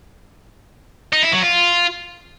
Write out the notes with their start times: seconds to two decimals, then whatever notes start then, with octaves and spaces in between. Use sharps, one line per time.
1.13 D#4
1.23 E4
1.33 F#3
1.42 F4